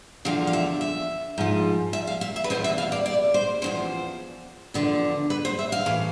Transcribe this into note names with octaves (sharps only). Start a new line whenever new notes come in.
E2 D3 F3 F5
F5
E5
E5
G#2 F3
E5
F5
E5
E5
B4
E2 B2 C5
E5
F5
D5
D5
C5
E2 C3 F3 C5
E2 D3 F3
B4
C5
E5
F5
A2 E3